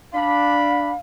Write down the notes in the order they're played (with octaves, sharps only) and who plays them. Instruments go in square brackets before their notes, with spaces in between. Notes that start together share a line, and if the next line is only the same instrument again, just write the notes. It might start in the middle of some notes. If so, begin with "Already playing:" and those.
[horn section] D4 B5 [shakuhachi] F5